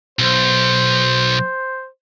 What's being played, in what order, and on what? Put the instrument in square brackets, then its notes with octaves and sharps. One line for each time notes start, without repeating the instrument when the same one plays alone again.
[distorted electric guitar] B1 [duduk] C5